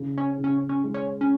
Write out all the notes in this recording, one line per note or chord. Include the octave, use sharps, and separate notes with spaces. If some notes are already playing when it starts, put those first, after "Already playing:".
Already playing: C#3
C#4
C#3
C#4
C#4
G#3
C#4
C#4